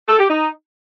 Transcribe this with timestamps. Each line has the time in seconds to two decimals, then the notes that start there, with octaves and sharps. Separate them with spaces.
0.08 A4
0.19 G4
0.29 D#4